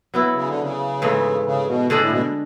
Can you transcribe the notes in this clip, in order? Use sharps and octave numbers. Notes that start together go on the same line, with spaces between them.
F#3 B3 E4
C#3
D3
C#3
G#2 E3 A3
C#3
B2
D3 G#3 D4
A2
B2